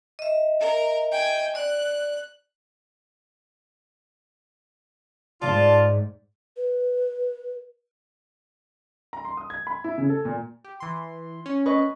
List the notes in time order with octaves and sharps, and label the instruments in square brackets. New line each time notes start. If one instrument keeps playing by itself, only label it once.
[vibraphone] D#5 E5
[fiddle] A#4
G5 G#5
[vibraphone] D5 [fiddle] F#6
[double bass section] G#2 [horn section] F4 A5 [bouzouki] D5
[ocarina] B4
[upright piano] A#5
C6
D#6
G#6
B5
E4
C#3
A4
A#2
[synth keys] G4
E3 C6
C#4
[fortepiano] B4 D#5 C#6